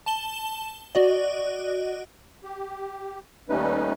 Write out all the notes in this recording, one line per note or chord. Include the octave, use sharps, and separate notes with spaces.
A5 E7 G7
F#4 D5 D#5
G4
D#2 G3 A3 C#4 D#4 B4